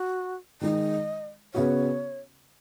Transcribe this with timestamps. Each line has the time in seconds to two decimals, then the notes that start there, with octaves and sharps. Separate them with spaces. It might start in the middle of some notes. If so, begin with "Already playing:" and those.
Already playing: F#4
0.61 D#3 G#3 D#4 D#5
1.54 C#3 B3 F#4 C#5